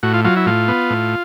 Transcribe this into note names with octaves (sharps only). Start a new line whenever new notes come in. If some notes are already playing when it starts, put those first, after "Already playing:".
A2 F#4
F4
F#3 F4
E4
A2 F4
B3
A2